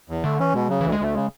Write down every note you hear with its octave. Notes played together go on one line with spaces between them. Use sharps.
E2
D3 A3
E3 C#4
B2 G#3
C#3 F#3
D2 E3
G#3
D2 A3
C#3 G#3